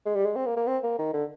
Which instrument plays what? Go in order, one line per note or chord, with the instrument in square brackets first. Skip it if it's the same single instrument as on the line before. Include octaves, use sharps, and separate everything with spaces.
[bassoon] G#3
G3
G#3
C4
A#3
A#3
C4
A#3
D#3
D3